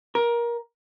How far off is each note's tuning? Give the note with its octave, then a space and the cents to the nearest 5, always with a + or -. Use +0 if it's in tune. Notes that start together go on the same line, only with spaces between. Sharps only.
A#4 +20